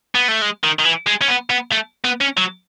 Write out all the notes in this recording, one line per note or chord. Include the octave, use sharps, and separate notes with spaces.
B3
A3
G#3
D#3
D#3
E3
G#3
C#4
B3
B3
A3
B3
C#4
F#3